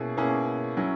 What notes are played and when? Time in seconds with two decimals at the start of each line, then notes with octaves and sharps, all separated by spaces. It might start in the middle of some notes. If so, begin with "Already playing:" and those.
Already playing: B2 A#3 C#4 E4 G#4
0.17 B2 A#3 C#4 E4 G#4
0.77 F#3 C#4 E4